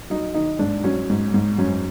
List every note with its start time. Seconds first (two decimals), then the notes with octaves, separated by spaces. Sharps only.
0.10 F#3 D#4
0.34 D#3 D#4
0.59 G#2 D4
0.84 F#3 C#4
1.10 G#2
1.34 G#2
1.58 F#2 C#4